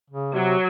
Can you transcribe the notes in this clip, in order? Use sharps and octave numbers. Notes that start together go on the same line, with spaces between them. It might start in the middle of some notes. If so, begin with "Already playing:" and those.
C#3
C3 F#3